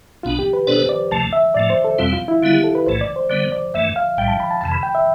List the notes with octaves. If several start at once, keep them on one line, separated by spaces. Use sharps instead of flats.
B1 B2 B3 D4 F4
G4
B4
B2 B3 D4 A4 C5 D5
D5
D2 C3 F3 A3 A5
E5
A2 F3 A3 D5
C5
A4
E2 B2 G3 C4 F4
F4
E4
D3 G3 B3 E4 F4
G4
A4
B4
B1 A2 E3 A3 C5
D5
C5
D3 G3 B3 D5
D5
G2 E3 A3 E5
F5
B1 A2 G3 G5
A5
B5
A5
F2 C3 E3 A5
B5
G5
E5